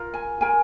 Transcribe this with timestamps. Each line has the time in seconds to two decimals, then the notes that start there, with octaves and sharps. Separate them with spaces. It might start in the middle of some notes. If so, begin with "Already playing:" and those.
Already playing: F4 A#4
0.14 G#5
0.41 F4 A#4 G#5